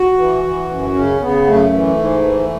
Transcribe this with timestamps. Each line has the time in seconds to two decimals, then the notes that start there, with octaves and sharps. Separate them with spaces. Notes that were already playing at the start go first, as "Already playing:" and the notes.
Already playing: F#4
0.18 E3
0.44 E3
0.70 F#2
0.95 C#3 C#4
1.21 C#3 B3
1.47 F#2 A3
1.72 E3
1.98 G#2
2.23 E3